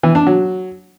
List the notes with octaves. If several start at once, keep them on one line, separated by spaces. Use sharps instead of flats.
E3
D4
F#3